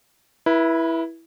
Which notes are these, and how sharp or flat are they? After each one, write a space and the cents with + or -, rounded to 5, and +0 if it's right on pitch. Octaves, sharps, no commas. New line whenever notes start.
E4 +0 B4 -35